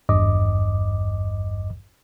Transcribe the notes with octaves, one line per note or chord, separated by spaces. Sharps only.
G#1 E2 G2 D#5 D6